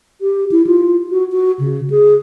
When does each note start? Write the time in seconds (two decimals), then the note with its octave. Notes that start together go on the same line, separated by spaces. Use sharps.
0.21 G4
0.52 E4
0.67 F4
1.11 F#4
1.32 F#4
1.59 C#3
1.90 G#4